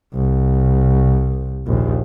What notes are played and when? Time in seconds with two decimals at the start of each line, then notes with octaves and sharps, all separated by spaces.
0.15 C2
1.67 A#1 D#2